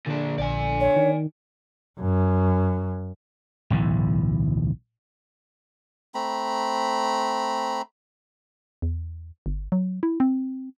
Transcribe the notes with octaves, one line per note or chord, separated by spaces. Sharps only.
A#2 D3 D4
A#1 D5 G#5
C#5
D#3
F#2
D1 B1 A2 E3
A3 C4 A#5 B5
E2
G1
F#3
E4
C4